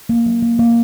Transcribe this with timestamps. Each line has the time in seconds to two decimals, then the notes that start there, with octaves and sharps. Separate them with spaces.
0.09 A#3
0.26 F#3
0.43 A#3
0.59 A#3